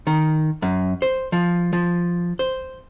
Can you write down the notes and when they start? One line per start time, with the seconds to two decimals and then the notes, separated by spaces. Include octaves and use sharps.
0.07 D#3
0.62 F#2
1.02 C5
1.32 F3
1.73 F3
2.39 C5